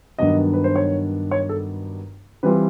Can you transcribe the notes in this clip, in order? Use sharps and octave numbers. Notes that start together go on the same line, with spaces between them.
G2 D#3 F#3 B3 D4 D#5
B4
C5
C#5
C#5
A4
E3 G3 C4 F4 B4